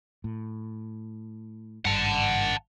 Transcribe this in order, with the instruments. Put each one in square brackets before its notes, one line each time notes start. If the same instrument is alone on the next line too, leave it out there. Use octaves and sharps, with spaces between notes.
[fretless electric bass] A2
[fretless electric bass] G#1 G2 [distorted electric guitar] F#5 A5